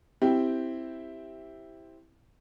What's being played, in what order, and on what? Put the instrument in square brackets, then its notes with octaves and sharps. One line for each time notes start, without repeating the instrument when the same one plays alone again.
[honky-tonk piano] C4 E4 G4